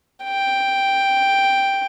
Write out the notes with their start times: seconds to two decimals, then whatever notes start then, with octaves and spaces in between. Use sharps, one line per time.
0.24 G5